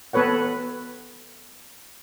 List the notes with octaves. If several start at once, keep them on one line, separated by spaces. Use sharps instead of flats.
B3 A4 B4 C#5 F#5